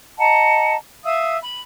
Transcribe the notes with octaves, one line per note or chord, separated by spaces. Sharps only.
D#5 F#5 A5 A#5
E5 F5 D#6 E6
B5